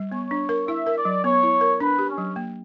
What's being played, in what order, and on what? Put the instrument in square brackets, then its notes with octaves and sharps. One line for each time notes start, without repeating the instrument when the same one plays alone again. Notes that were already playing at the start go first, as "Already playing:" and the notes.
Already playing: [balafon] G3
[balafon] B3 [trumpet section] C#5
[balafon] D4
A#4
[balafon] E4 [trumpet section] E5
[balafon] A#4
[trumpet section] D5
[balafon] F#3
[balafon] B3 [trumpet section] C#5
[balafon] E4
A#4
[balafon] D4 [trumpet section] B4
[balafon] G4
[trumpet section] C#4
[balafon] F#3
A#3